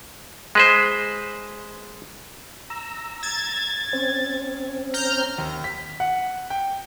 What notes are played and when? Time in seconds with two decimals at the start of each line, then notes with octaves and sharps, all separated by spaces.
0.55 G#3 B4 C5
2.70 A#5 E6
3.23 G#6 A6
3.93 C4 C#4
4.94 A#5 F6 G6
5.38 D#2
5.64 B6
6.00 F#5
6.50 G5